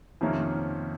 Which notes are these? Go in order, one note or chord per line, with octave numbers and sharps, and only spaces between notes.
F2 C3 D#3 A#3 C#4